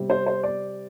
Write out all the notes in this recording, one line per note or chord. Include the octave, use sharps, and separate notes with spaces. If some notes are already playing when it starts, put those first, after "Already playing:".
Already playing: C3 G3 C4
C5
C5
D5